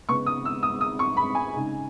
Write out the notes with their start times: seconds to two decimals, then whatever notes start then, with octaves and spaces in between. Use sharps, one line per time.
0.09 C#3 G#3 B3 C#6
0.26 D#6
0.45 E6
0.63 D#6
0.81 D#6
0.99 C#6
1.17 B5
1.35 G#5
1.53 C#3 G#3 D#4